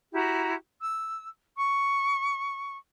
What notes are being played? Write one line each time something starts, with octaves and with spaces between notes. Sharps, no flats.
E4 F#4 G4 A#5
E6
C#6